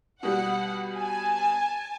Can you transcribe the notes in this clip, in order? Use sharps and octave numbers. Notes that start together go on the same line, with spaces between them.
B2 G3 F#5
G#5 A5